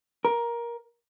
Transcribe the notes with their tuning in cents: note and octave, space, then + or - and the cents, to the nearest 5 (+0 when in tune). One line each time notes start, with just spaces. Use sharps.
A#4 +15